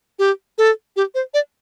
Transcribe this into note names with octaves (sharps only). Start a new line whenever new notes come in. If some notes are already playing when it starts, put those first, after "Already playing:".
G4
A4
G4
C5
D5